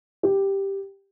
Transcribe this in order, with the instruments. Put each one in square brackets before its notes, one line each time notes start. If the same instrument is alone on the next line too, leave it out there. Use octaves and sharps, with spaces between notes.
[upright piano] G4